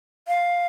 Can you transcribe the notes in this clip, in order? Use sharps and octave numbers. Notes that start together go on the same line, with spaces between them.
F5